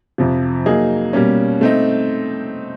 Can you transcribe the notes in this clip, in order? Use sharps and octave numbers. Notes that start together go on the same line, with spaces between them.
F2 C3 F3
F#3 A#3 D#4 G#4
B2 G3 A#3 C#4
A3 C4 D#4